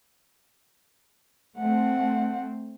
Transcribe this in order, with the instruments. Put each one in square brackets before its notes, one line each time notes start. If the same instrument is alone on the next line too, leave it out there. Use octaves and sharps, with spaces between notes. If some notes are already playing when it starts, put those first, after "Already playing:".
[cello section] A3 C4 [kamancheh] F#5